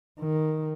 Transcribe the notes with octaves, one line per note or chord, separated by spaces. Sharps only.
D#3